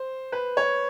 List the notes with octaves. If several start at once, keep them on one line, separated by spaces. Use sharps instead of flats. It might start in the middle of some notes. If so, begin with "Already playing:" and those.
Already playing: C5
B4
C#5